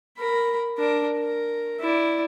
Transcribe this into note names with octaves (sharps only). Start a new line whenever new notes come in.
A#4 B5
D4 A#4
A#4
E4 D5